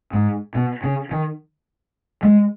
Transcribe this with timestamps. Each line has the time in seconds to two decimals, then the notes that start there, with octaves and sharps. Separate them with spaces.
0.13 G#2
0.55 B2
0.84 C#3
1.11 D#3
2.23 G#3